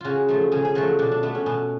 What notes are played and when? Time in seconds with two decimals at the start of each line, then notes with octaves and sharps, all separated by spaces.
0.01 C#3 F4 F#4
0.28 F3 A3
0.52 C#3 G#4
0.65 G#4
0.75 F3 A3 F#4
0.99 B2 D4
1.11 D4
1.23 A3 B3
1.35 C#4
1.46 B2 B3